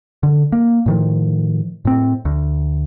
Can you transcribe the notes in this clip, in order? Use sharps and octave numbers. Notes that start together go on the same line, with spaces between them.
D3
A#3
A2 D#3 F3
A2 C4
D2